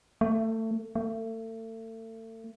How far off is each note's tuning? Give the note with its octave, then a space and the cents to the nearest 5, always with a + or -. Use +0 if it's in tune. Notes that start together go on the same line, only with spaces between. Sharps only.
A3 +25
A3 +35